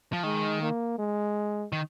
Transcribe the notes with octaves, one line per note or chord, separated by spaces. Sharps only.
F3
D#3 G#3
A#3
G#3
D#3